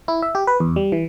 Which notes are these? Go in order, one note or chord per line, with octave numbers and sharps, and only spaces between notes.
E4
E5
G4
B4
E2
G3
E3